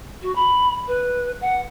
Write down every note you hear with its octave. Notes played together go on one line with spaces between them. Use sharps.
F#4
B5
B4
F#5